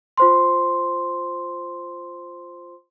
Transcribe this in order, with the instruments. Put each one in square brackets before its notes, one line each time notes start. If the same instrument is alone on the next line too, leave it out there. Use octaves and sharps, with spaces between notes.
[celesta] F4 C5 C6